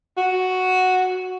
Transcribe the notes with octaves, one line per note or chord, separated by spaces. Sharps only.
F#4